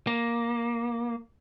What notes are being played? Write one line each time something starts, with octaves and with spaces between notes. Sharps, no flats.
A#3